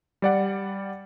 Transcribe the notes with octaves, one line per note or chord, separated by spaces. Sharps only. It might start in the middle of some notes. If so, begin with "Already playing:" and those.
G3 D5 F#5